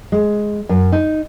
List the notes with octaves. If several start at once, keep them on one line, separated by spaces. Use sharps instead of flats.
G#3
F#2
D#4